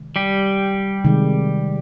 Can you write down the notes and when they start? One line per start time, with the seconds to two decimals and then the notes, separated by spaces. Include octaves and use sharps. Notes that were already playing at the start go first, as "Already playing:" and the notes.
Already playing: C3 D#3 G#3
0.16 G3 G4
1.05 C3 D#3 G#3